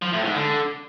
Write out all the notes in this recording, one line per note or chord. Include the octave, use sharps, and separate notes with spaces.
F3
A2
G#2
D3